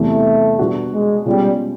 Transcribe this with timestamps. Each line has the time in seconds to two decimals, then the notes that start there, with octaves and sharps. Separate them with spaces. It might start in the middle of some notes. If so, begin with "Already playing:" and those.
Already playing: E2 C3 E3 G3 A3
0.59 B2 G3 B3 D4 F#4
0.93 G#3
1.26 B2 G3 G#3 C#4 F4